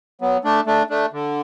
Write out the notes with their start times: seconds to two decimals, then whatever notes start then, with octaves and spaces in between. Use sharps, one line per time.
0.21 F#3 B3
0.44 A3 D4
0.66 A3 D4
0.90 A3 D4
1.13 D3